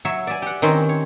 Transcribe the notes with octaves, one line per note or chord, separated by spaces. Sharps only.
F#3 C#5 E5
D5 E5 G#5
G4 F#5
D#3 C4 C#4 C5
C#5